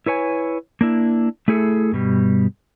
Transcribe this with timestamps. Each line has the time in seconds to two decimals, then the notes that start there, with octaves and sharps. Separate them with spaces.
0.06 E4 B4 C#5 G#5
0.81 A#3 D4 E4
1.48 A3 E4 G#4 A4
1.92 G2 B2 G3